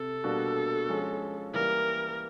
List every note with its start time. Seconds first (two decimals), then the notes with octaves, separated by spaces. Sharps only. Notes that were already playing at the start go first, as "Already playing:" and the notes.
Already playing: C3 A4
0.24 B2 G3 A#3 D4 F#4
0.89 F3 G#3 C#4
1.54 E3 G3 A#3 A#4